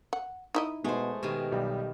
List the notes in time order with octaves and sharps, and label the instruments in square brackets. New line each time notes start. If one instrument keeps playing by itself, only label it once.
[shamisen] F#5
D#4 E4 D#5
[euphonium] B2 [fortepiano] G#3 [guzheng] A3 C5
[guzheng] B2 D#3 G#4 [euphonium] G4
[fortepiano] B1 G3